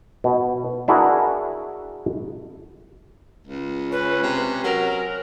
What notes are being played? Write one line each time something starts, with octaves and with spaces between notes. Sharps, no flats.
B2
D4 E4 F#4 G#4 A#4
C#2
C#4 B4
C3
F#3 A#4